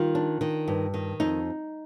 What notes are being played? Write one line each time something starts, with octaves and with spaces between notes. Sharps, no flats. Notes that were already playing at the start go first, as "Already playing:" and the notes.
Already playing: D#3 G3 F4
D4
D#3
G2
D#3
F2 D#4